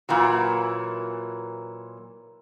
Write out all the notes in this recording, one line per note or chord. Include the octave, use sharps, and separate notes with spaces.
A#2 E3 F#3